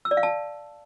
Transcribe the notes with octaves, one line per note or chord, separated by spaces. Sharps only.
E6
D5
F5
A5